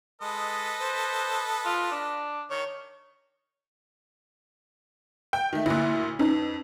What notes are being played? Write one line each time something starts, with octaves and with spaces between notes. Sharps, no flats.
G#3 A4 B4 D#5
C5
F4
D4
D#3 C#5
G5
D#3 A3
D2 A#2 E4 F#6
F2 C#4 D#4 B4